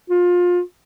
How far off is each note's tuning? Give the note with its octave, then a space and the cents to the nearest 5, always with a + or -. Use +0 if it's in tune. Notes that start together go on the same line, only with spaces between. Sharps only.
F4 +25